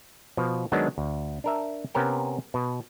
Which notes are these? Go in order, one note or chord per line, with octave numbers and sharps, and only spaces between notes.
B2 F3
D#3 F#3 G#3 B3 D4
D2
D4 A#4 E5
C3 B3 C#4 A#4 G5
B2